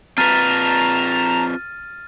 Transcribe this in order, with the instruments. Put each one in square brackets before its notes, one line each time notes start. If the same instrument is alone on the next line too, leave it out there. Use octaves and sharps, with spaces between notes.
[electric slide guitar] C4 F4 B4 [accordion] A5 A#5 [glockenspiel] F6 A6 D#7